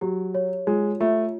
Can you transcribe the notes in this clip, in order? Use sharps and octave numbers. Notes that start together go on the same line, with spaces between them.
F#3 G4
C#5
G#3 F4
A3 F4